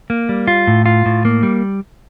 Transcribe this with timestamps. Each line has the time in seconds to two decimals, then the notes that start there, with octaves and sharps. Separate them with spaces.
0.10 A#3
0.29 G3
0.47 F4
0.67 A2
0.86 F4
1.06 A2
1.25 A#3
1.43 G3